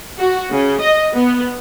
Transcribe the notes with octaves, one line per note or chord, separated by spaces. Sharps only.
F#4
C#3
D#5
B3